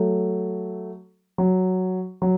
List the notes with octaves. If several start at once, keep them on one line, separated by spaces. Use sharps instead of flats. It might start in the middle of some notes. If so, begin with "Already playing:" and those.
Already playing: F#3 A3
F#3
F#3